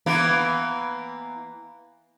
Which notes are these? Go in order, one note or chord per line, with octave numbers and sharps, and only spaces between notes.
E3 A#3 B3